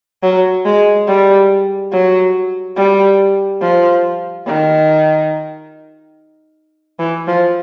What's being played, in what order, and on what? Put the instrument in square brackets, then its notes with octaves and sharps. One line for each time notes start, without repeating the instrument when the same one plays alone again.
[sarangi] F#3
G#3
G3
F#3
G3
F3
D#3
E3
F3